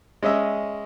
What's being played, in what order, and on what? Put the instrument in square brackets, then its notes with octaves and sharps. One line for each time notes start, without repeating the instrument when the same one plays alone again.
[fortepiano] G#3 C#4 D#5 E5